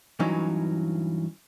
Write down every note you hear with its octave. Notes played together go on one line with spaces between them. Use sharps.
G2 E3 F#3 C#4 D#4